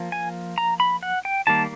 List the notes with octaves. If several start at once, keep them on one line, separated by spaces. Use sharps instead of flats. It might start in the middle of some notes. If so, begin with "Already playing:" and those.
Already playing: F3 A#3
G#5
A#5
B5
F#5
G5
D#3 G3 A#3 A5